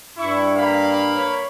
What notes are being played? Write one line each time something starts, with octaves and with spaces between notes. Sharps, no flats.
G2 E4 C#6
A#3 F5 B5
C#5